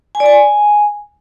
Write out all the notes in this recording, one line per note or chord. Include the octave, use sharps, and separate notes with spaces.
G#5
D5
G#5